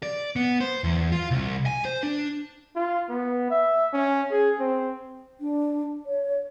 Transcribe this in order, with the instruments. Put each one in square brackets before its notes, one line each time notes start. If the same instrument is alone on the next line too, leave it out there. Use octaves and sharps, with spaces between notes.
[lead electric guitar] D5
B3
C5
E2
F4
C2
G#5
C5
D4
[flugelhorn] F4
B3
E5
C#4
G#4
C4
[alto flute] D4
C#5